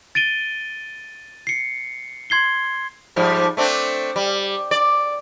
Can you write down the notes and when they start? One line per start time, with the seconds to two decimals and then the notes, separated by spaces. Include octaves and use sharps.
0.15 A6 D7 D#7 G7
1.47 C7 C#7
2.30 C6 G#6 C7 G7
3.16 G#2 F3 G3
3.57 A3 C4 D4
4.16 G3
4.71 D5